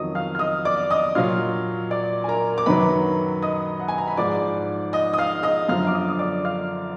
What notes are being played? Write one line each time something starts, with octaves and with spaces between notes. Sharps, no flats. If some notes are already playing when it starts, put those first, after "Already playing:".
Already playing: F2 D#3 F#3 D#5 D#6
F5 F6
F6
D#5 D#6
D5 D6
D#5 D#6
A#2 F#3 F5 F6
D5 D6
G#5
A#4 A#5
D6
F#2 D#3 F#3 B4 B5
D#5 D#6
F#5
G#5
A#5
B5
G#2 F3 D5 D6
D#5 D#6
D#6
F5 F6
D#5 D#6
F#2 D3 F3 F5 F6
D6
D#5 D#6
D#6
D5 D6
F5 F6